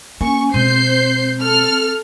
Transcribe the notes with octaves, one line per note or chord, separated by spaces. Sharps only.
A#3 C#4 G#5 C#6
B2 G#3 C4 C5 G6 C7
A4 F6